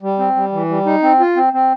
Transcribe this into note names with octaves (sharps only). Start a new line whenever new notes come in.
G3
C4
G3
E3
G3
D#4
C4
F4
C4
C4